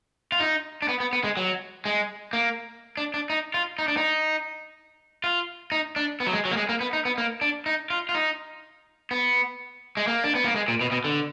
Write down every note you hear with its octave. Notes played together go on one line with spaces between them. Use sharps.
F4
D#4
D4
B3
B3
B3
G#3
F#3
G#3
A#3
D4
D4
D#4
F4
D#4
D4
D#4
F4
D#4
D4
B3
F#3
G#3
F#3
A#3
G#3
A#3
B3
D#4
B3
A#3
D4
D#4
F4
F4
D#4
B3
G#3
A#3
D4
B3
A#3
G#3
A#2
B2
B2
D3